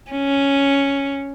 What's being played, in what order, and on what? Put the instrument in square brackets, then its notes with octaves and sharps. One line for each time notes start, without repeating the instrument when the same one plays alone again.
[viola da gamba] C#4